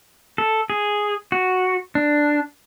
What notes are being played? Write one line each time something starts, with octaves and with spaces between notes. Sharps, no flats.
A4
G#4
F#4
D4